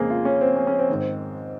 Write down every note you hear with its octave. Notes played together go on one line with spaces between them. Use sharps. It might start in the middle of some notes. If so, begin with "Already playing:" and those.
Already playing: F2 C#3 G#3 A#3 C4 G#4
F4
C#4
C4
C#4
C#4
C4
G#2 D#3